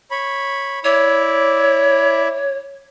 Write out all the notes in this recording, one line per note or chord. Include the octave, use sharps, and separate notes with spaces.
C#5 B5
E4 C#5 D5 E5